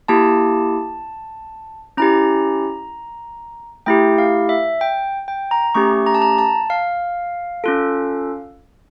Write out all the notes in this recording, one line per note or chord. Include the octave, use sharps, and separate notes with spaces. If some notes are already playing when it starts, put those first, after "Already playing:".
A#3 E4 G4 A5
C#4 E4 G4 A#5
A3 E4 G4 G5
F5
E5
G5
G5
A#5
A3 C#4 G4 C#6
A#5
A5
A#5
A5
F5
C#4 F4 A4